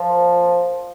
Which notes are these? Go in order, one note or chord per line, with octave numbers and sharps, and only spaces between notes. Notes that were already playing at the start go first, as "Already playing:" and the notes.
Already playing: F3
A#2